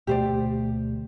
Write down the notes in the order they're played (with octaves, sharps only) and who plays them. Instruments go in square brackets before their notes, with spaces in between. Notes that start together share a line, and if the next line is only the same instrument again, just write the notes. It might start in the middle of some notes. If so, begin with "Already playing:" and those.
[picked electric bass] D2 B2 A3 [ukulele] G4 C5 D5